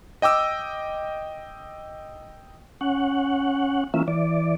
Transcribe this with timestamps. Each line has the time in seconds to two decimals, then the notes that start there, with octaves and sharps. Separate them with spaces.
0.22 D#5 G5 D6 E6
2.81 C#4 F#5
3.94 E3 A#3 C#4 F4 E5
4.08 E3 D5